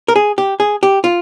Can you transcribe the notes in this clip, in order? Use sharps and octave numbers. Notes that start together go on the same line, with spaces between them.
A#4
G#4
G4
G#4
G4
F4